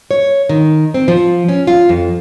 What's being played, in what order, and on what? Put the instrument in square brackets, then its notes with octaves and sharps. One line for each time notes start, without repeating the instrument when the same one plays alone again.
[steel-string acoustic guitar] C#5
D#3
C4
F3
C#4
F4
F2